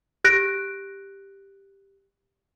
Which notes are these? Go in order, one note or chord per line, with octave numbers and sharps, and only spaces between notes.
G4 F#6 A#6 D7